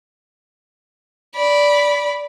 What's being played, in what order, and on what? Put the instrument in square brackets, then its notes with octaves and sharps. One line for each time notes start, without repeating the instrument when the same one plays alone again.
[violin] D5 B5